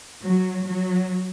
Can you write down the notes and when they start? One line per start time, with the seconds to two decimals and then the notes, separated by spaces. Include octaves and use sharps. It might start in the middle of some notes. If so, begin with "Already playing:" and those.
0.23 F#3
0.65 F#3